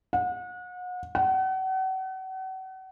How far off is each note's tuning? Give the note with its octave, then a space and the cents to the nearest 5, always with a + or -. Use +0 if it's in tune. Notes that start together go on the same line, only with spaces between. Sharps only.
F#5 -35
F#5 +40